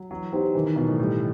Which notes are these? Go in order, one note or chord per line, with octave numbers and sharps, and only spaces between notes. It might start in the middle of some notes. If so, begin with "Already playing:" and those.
Already playing: F#3
E3 F#3
B3 D#4 G4 C5
D#3 E3
D#3
B2 F#3 B3
A2
A2 G3